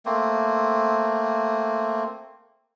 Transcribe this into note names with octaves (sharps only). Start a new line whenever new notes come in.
A3 A#3 C4